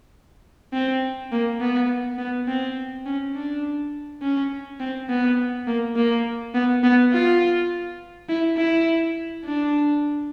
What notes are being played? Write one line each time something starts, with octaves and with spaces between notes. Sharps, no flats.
C4
A#3
B3
B3
C4
C#4
D4
C#4
C4
B3
A#3
A#3
B3
B3
F4
E4
E4
D4